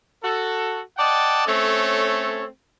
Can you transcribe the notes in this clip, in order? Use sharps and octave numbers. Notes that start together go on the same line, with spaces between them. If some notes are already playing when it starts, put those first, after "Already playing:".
F#4 A4
D5 D#5 F#5 G5 A5
A3 C4 C#4 A4 C#5